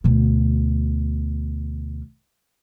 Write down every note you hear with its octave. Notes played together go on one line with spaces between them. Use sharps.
D2 B2